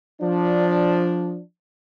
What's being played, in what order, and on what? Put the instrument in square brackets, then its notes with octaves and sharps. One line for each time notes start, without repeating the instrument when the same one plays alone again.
[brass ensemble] F3 D4